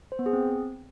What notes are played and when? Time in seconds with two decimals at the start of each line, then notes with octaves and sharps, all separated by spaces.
0.12 C5
0.19 B3
0.26 G#4
0.33 C4